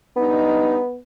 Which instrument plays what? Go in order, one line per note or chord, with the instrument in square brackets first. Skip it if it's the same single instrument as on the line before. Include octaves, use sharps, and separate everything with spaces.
[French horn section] G3 D4 D#4 [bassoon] B3